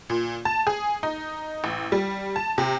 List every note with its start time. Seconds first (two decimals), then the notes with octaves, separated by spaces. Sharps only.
0.10 A#2
0.45 A5
0.67 G#4
1.03 D#4
1.64 A1
1.92 G3
2.36 A5
2.58 C3